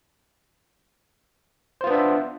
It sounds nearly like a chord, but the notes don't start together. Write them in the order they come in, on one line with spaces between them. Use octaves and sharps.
C5 F4 B3 D4 E5